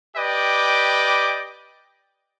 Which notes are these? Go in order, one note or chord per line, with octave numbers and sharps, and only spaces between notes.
G4 B4 D5 D#5 G5 D6